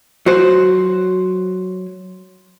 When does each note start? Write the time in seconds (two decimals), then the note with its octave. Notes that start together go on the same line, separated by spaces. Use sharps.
0.26 F#3 F#4 C5